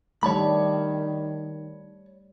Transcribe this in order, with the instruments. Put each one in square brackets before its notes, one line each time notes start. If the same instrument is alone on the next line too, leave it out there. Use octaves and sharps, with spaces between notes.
[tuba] D#3 [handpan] G3 A3 [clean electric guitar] C#5 A5 B5